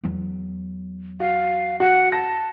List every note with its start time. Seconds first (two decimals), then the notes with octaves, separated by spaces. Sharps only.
0.03 E2 F#3
1.20 F#4 F5
1.80 F#4 F#5
2.12 A5 A#6